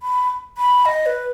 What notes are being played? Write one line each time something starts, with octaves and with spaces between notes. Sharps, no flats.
B5
B5
D#5
B4